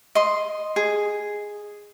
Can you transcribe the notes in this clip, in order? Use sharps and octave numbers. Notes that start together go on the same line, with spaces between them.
D#5 C6
G#4